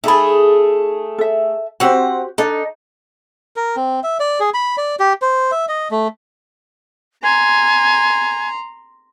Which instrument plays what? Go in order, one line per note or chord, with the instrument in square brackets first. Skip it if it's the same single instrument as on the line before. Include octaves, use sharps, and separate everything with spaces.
[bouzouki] A3 G#4 [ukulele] D#4 A4 B5
[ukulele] A4 E5
[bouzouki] C4 F#5 [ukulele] F#4 G4 C5
[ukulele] D4 A4 [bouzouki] D#4
[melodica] A#4
C4
E5
D5
G#4
B5
D5
G4
C5
E5
D#5
A3
[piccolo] G#5 [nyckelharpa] A#5 C6